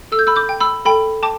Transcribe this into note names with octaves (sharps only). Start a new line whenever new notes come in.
A4 E6
G6
B5 E6
D6 G6
G5
B5 E6
A4 G5 B5
G5 A5 D6